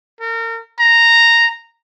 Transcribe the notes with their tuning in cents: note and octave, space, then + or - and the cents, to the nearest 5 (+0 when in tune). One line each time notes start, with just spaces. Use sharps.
A#4 -35
A#5 -5